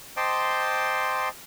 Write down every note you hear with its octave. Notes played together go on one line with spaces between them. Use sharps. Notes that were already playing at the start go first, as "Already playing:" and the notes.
C5 D#5 G5 A5 C6 D6